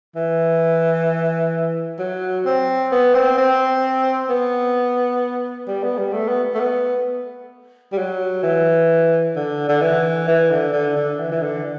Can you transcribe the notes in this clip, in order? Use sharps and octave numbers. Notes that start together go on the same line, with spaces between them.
E3
F#3
C4
B3
C4
C4
B3
G3
B3
G3
A3
B3
A3
B3
G3
F#3
E3
D3
D3
E3
E3
D3
D3
D3
E3
E3
D3